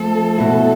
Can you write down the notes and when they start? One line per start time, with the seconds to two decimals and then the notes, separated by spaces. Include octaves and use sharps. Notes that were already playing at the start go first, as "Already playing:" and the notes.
Already playing: F3 A3 C4 A4
0.37 B2 A3 E4 A4